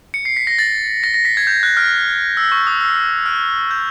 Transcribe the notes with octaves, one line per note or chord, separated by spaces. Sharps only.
C#7
C7
B6
A#6
A6
A#6
A#6
B6
G#6
G6
F#6
F6
E6
C#6
D#6
E6
F6
G6